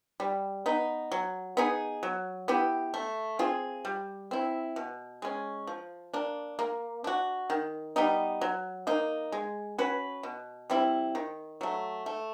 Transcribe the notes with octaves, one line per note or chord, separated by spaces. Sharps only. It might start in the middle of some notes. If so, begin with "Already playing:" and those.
G3
B3 D#4
F#3
B3 D#4 G#4
F#3
B3 E4 G4
A3
C4 F4 G#4
G3
C4 E4
B2
G#3 C#4
F3
A#3 D4
A#3
D4 F#4
D#3
G3 B3 D#4
F#3
A#3 D#4
G#3
C#4 F#4 B4
B2
G3 C4 E4
D#3
F#3 A3
A3